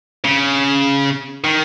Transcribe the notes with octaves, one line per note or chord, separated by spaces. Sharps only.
C#3
D#3